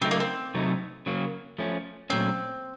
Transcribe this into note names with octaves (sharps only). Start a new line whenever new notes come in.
C#3 F#3 A3 C4 D#4
A#3
C4
C3 F#3 A3 D#4
C#3 F#3 A#3
F3 A3 C#4
A#2 F#3 A3 C4 C#4